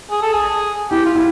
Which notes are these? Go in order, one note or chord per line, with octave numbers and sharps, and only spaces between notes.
G#4
A4
G#4
E4 G4
F4
E4